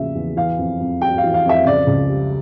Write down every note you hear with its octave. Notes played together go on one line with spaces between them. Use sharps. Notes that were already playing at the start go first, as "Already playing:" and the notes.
Already playing: E2 C#3 F3 A#3 E5
E2
E3 F5
F2
F2
G3 G5
F5
E3
F5
F2 E5
C#3 D5
C#2
G3